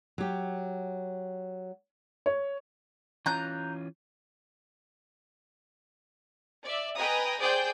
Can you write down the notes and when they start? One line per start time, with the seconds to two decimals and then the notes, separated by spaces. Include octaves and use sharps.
0.18 F#3 G4
2.26 C#5
3.26 E3 C#4 F4 A#5 F#6 G6
6.63 D5 E5
6.97 B4 D#5 G5 G#5 A#5 D#6
7.38 G#4 C5 D5 G5 D#6 G6